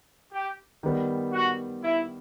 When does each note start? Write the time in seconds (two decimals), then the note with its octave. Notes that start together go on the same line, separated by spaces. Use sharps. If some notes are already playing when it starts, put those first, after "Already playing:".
0.32 G4
0.83 D#3 G3 B3
1.33 F#4
1.83 E4